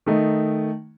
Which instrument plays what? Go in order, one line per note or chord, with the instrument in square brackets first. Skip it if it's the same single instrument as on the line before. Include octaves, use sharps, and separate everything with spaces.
[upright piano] D#3 A3 D#4